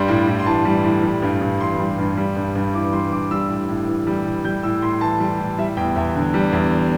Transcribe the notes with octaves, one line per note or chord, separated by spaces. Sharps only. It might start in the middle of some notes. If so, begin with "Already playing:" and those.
Already playing: G2 G3 C6
A2
A2
C6
E3 A5
G3
A2
G3
G2
G2
E3 C6
G3
G2
G3
G2
G2
E3 D6
G3 C6
G2 D6
G3 E6
A2
A2
E3
G3
A2
G3 G6
A2 E6
A2 C6
E3 A5
G3
A2
G3 E5
E2 G5
E2 E5
D3
G3
E2